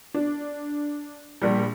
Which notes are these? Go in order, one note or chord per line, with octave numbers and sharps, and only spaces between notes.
D4
A#1 G3